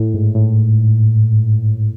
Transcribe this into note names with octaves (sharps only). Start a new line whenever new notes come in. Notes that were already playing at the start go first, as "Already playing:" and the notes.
Already playing: A2
G#2
A2